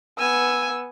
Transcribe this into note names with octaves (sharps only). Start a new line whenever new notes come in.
B3 G#5 E6